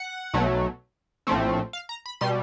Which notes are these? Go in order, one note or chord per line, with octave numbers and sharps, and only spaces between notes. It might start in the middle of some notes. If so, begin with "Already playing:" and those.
Already playing: F#5
B1 B2 F#3 A3
A#1 A2 F3 A3 C4
F5
A#5
B5
B2 G3 C6